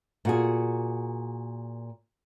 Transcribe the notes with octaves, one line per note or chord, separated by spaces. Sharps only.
A#2 F#4 G#4